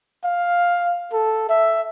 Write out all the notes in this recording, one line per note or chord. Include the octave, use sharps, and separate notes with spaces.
F5
A4
E5